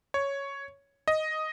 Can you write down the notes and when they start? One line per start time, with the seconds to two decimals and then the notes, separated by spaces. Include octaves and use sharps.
0.14 C#5
1.08 D#5